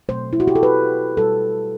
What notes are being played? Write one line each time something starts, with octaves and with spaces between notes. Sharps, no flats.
B2 F#3 A3 C5
E4
F#4
G4
A4
B4
B2 G3 A4